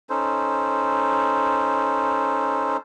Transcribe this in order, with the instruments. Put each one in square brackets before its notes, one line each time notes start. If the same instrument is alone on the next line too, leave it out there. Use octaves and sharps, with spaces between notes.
[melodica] C#4 D#4 A4 C5